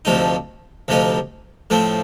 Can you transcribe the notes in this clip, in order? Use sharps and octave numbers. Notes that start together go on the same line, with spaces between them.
D2 C3 F3 A3 D#4
D2 C3 F3 A3 D#4
A2 F3 A3 C4